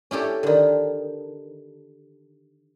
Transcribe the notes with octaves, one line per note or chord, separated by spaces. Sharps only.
C#4 E4 G4 A4
D3 D#3